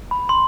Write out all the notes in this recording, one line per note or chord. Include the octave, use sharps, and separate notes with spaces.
B5
C6